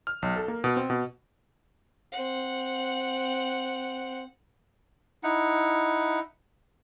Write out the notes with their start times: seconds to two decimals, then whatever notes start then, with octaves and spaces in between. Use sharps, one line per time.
0.07 F6
0.22 B1
0.36 A4
0.48 A#3
0.64 B2
0.77 C4
0.90 B2
2.12 C4 F#5
5.23 D#4 E4 F#5